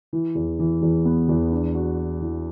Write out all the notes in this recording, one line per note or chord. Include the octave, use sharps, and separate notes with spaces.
E3
E2
E3
E2
B3
E2
D4
F#4
F#4
E3